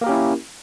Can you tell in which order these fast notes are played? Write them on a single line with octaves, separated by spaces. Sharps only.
A#3 A#4 G4 C#4 E4